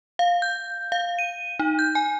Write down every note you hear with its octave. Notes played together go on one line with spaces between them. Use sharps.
F5
G6
F5
D#7
D#4
G6
G#5